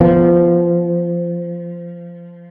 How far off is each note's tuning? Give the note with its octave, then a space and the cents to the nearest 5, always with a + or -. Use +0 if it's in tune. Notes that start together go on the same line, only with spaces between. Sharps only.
F3 -15 B3 +0